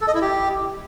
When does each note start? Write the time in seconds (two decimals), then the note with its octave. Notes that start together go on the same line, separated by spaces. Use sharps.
0.01 A4
0.08 D#5
0.15 E4
0.21 G4